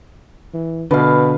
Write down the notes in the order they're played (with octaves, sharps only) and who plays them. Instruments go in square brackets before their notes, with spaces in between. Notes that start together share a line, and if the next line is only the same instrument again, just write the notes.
[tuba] E3
[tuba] B2 [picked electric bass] D3 [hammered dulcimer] B4 F5